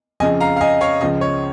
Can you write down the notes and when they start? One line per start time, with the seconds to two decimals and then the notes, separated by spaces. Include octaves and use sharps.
0.20 F2 C#3 F3 D#5 G#5
0.40 F5 A#5
0.56 F5
0.61 D#5 G#5
0.81 C#5 F5
1.01 C#2 C#3 F3 D#5
1.21 C#5